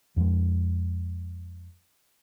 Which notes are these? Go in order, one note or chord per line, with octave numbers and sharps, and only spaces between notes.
F2 F3 F#3 G#3